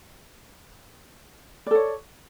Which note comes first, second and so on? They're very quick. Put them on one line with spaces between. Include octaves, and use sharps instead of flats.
D5 A4 C#5